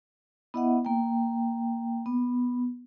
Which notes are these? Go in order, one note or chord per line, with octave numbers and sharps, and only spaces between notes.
B3 E4 D#5 E5 F#5
A#3 G5
B3